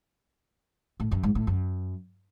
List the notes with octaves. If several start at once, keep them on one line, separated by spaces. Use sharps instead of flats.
A2
F#2
G#2
A2
F#2